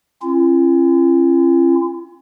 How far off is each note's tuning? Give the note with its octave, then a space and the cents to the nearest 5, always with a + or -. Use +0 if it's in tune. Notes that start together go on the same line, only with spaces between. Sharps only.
C#4 -40 F4 -45